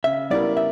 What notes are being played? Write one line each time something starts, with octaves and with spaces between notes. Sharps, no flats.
C#3 E5
G3 B3 E4 A#4 D5
E5